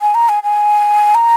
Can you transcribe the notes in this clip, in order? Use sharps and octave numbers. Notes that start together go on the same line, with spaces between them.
G#5
A#5
G#5
G#5
A#5